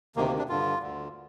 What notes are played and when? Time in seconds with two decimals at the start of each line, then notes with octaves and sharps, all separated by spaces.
0.16 D2 C3 D#3 A#3
0.27 A#3
0.38 D4
0.49 G2 D3 F4
0.82 D2 D3